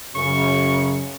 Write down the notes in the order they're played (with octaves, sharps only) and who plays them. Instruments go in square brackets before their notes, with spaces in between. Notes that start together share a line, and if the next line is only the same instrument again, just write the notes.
[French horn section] F#2 C#3 [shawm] C#6